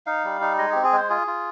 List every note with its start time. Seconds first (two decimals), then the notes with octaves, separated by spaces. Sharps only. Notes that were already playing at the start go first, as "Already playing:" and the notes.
0.06 D#4 F5
0.24 G3
0.41 D#4
0.58 G#3 D#5
0.72 C4 G4
0.85 G#4
0.93 G#3 C5
1.10 F4 G#4
1.27 F4